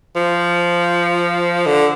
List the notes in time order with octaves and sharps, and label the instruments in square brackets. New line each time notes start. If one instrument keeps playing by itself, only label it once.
[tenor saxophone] F3
D3